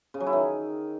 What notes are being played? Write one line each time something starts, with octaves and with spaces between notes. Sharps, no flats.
C#3
F#3
E4
D#3